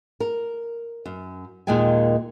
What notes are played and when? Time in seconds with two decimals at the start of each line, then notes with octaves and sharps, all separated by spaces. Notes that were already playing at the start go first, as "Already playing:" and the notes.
0.20 A#4
1.06 F#2
1.67 D#2 A#2 D#3 G#3 G5 G#5